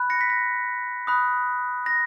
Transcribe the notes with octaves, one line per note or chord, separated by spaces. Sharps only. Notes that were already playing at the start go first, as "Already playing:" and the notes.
Already playing: B5 F#6
A#6 C#7
B6
A#6
B5 D#6 F#6
A#6